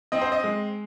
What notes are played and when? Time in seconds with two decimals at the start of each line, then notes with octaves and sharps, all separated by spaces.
0.12 C4 D#5
0.22 C5
0.32 D#5
0.44 G#3